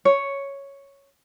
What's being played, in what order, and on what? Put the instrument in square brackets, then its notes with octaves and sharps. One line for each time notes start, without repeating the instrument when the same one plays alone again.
[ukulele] C#5